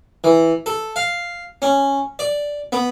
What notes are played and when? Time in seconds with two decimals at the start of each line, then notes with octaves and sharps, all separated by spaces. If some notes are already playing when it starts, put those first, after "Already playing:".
0.24 E3
0.66 A4
0.96 F5
1.62 C#4
2.19 D5
2.72 B3